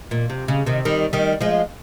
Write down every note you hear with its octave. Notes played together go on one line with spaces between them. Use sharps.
A#2
C3
C#3
C3 D#3
D#3 G3
D#3 G3
F3 G#3